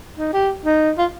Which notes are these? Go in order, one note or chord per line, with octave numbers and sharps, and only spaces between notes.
D#4
G4
D#4
F4